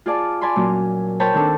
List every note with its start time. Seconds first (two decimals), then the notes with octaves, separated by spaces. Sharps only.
0.06 F4 G#4 D5 A5
0.41 D5 G#5 A5 B5 C6
0.56 A#2 F#3 C#4
1.20 A#4 C5 C#5 G5 A5 B5
1.34 D#3 C4 D4 A4